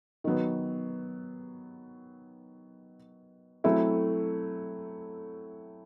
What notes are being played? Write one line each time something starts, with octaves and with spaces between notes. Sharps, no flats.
D#3 F#3 B3
F#3 A3 C4 E4